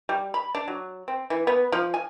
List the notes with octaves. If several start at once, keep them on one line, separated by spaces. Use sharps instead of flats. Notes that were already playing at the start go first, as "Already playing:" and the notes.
G3
B5
D4
F#3
C4
E3
B3
F3
G#5